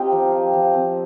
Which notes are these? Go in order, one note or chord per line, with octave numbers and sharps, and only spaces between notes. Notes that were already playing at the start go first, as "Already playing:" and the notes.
Already playing: C4 F4 G4 D#5 F5 G5 A#5
F3
F4
F3
C4